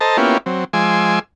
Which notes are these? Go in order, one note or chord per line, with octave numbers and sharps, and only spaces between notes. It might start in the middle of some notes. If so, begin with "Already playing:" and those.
A4 C5 D#5 A5 A#5
A#3 B3 C#4 E4 F4 G4
F#3 C4
F3 G#3 G#5 C6 D6 E6